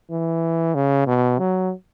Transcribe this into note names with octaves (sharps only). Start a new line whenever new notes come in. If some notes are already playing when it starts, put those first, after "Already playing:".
E3
C#3
B2
F#3